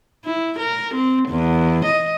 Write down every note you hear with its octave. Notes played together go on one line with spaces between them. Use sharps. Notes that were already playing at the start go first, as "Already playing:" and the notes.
E4
A#4
C4
E2
D#5